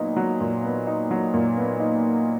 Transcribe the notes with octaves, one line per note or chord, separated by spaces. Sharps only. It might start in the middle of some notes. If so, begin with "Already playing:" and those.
Already playing: A#2 F#3 B3 D#4
F#3
A#2
B3
D#4
F#3
A#2
B3
D#4